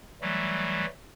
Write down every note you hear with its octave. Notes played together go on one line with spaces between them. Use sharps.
E3 F#3 G3 A3